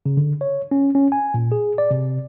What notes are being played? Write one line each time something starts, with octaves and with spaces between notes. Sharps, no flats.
C#3
D3
C#5
C#4
C#4
G#5
A#2
G#4
D5
C3